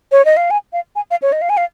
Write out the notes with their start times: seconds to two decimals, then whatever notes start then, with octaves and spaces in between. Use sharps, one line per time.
0.12 C#5
0.25 D#5
0.37 F5
0.51 G#5
0.73 F5
0.96 G#5
1.11 F5
1.22 C#5
1.32 D#5
1.42 F5
1.49 G#5
1.57 F5